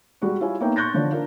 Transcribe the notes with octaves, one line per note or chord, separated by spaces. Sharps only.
G3 G#3 F#4 G4
E4 F4 G4 C#5 G#5
A#3 B3 D#4 C#5 E5 G5
C6 C#6 F#6 G6 A6 A#6
D3 F3 D4 C#5
D4 F4 A#4